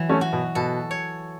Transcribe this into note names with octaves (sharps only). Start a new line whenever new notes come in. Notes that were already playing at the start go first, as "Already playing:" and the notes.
Already playing: E3 F#3
A3 C#4
F#4
B2
B2 A4
C#5